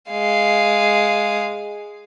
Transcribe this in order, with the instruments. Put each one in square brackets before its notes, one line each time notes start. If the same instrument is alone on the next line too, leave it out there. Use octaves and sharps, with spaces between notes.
[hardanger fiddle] G#3 F5